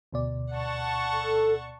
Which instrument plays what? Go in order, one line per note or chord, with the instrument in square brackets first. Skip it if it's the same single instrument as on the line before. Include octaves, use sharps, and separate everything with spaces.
[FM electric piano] D2 B2 D5
[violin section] F#5 A5 C#6
[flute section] A4